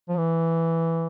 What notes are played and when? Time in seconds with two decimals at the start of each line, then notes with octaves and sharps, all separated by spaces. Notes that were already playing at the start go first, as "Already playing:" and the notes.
0.09 F3
0.18 E3